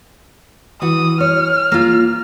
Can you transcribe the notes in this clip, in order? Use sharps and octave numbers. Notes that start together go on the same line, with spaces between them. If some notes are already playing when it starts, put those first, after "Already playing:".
E3 F#4 D#6
C#5 F6
A#3 F4